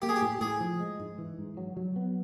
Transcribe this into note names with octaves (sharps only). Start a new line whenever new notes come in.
A#3 G4
G#4
G4
A2
A2 G#4
F3
G#3
G#2
E3
G#2
F#3
F#3
B3